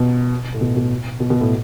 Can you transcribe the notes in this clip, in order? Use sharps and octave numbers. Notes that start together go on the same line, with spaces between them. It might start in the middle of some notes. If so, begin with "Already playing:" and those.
Already playing: B2
A2
B2
B2
B2
B2
A2